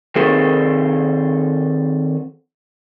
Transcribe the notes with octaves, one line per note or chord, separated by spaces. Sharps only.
D#3 C4 G#4 A4 C5